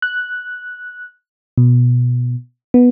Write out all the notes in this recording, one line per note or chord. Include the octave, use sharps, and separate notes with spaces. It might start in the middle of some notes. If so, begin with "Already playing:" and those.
F#6
B2
B3